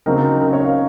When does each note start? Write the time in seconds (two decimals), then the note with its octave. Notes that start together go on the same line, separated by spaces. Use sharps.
0.06 C#3 F#3 C4 D#4 A#4
0.41 A#4
0.53 C#5
0.65 F5